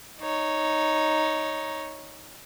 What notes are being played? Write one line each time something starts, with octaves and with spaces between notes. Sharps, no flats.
D#4 C#5